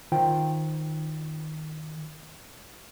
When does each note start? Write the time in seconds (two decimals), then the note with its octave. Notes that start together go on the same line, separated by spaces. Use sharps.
0.12 D#3 F4 C5 G5